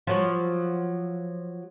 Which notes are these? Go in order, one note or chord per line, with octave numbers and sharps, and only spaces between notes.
F3 F#3